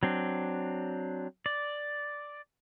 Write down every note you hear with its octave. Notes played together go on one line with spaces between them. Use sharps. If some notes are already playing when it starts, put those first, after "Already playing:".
F#3 C4 D4
D5